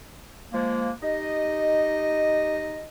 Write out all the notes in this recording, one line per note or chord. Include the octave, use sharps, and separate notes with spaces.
F3 G#3 A#3
D#4 G4 D#5